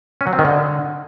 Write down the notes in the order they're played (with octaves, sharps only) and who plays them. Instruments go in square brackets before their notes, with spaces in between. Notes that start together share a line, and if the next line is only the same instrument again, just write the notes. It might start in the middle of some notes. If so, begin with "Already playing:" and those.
[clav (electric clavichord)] C#4
F#3
C4
D#3
D3